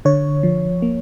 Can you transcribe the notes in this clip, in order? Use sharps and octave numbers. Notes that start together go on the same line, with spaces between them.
D3 C#5
F3
A#3